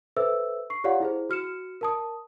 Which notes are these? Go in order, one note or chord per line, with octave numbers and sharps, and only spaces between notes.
A4 B4 C5 E5 E6
C#6 C7
F4 G4 C#5 D5 F5 F#5
E4 G#4 C5
F#4 F6 C#7 E7
A#4 A5 D#6